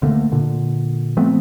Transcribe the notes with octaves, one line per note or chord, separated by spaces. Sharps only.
D2 D3 A3 A#3
A#2 D3
F3 A3 B3 C4